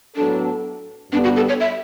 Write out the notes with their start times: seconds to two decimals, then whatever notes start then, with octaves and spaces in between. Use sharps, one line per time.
0.16 A2 F#3 B3 D4 F#4 A4
1.12 G2 D3 G3 B3 D4
1.24 F#4
1.36 A4
1.49 C#5
1.60 E5